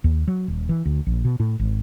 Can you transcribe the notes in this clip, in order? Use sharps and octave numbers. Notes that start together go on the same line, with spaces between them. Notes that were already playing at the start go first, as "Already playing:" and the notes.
D#2
F#3
D#1
E3
D2
A#1
B2
A2
G#1